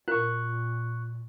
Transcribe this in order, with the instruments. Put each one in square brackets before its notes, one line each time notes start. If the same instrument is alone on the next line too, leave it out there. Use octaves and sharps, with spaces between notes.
[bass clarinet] A#2 [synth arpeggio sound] F4 A#4 [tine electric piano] C#6 F#6